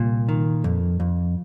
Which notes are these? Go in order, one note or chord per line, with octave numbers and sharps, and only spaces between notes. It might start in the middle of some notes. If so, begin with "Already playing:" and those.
Already playing: C2 A#2
D#3
F2
F2